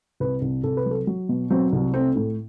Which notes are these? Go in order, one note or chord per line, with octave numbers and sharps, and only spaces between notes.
C2 B4
C2
C2 A4
B4
F#3
A4
F#3
B2
F#3 C4
C2
A3 C4
A2